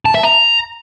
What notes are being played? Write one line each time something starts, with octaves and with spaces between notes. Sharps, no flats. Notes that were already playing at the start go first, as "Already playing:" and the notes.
A5
E5
A#5